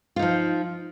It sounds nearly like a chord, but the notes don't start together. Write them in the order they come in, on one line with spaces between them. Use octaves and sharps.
F4 D#4 F3